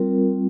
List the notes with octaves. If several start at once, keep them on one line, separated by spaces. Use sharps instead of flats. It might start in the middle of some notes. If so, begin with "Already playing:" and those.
Already playing: G3 C4 F4 A#4